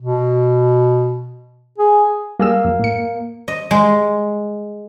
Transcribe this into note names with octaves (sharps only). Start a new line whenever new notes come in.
B2
G#4
G3 A#3 G#4 E6
F#2
A2 C#7
D#5
G#3